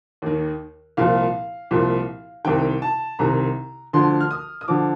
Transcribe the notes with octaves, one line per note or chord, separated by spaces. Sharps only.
D#2 D#3
C2 A#2 F3 F5
C2 A#2 F3
C2 C3 D#3 G5
A5
C2 C3 D#3 A#5
D2 D3 F3 C6
F6
D#6
D#6
D3 F3 D6